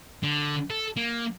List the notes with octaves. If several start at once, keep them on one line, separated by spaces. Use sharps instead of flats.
D3
A4
A#3